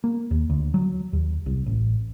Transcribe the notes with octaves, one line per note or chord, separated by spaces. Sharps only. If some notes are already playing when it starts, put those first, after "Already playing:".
A#3
D#2
D2
F#3
D#2
C2
A1